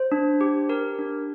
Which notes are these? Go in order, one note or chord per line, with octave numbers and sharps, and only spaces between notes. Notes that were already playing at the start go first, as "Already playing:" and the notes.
Already playing: C5
D4
G4
G4 A#4
D4